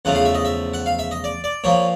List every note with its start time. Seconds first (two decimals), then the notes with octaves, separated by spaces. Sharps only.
0.05 E2 C#3 F3 A3 F#5
0.15 F5
0.25 E5
0.35 D#5
0.45 E5
0.74 F#5
0.86 F5
0.99 E5
1.11 D#5
1.24 D5
1.44 D5
1.64 A#2 F3 A#3 C#5